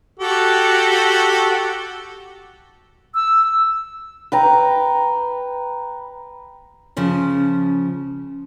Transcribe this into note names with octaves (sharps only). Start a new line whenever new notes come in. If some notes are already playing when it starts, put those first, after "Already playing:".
F#4 G4 A4
E6
B4 G5 A#5
C#3 F3 C#4